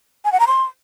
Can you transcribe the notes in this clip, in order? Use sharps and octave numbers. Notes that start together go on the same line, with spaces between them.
G#5
F#5
A#5
C6